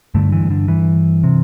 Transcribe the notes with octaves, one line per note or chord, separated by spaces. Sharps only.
G2 D3 A3
E3
D3
E3
C3